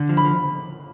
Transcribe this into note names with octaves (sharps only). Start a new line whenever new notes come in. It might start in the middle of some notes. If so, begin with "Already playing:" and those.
Already playing: D3
F3
B5
F3